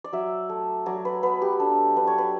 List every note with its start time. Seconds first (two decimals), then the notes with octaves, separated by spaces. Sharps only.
0.04 D5
0.13 F#3 E5
0.49 A3
0.86 F#3 D5
1.05 B4
1.23 B3 B4
1.42 G4
1.60 D4 A4
1.97 D4 B4
2.07 C#5
2.18 B4